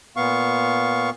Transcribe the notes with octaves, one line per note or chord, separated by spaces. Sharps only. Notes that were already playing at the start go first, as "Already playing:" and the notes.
A#2 B3 F5 C#6